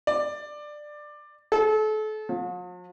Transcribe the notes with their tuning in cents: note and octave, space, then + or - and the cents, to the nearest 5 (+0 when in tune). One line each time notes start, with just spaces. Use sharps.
D5 +15
A4 -35
F3 +45